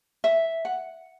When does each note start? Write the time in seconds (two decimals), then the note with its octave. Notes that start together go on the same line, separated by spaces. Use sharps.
0.24 E5
0.65 F#5